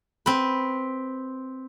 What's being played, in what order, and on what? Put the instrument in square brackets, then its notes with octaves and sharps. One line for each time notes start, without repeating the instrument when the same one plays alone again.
[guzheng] C4 B4